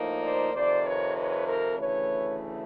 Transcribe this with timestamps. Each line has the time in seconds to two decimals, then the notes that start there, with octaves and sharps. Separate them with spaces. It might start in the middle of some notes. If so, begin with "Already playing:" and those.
Already playing: A2 F3 A#3 D#4
0.22 C5 D5
0.53 F2 C3 D#3 C5 D5
0.85 B4 C#5
1.15 B4 C#5
1.47 A#4 C5
1.78 D2 C#3 E3 A3 B4 C#5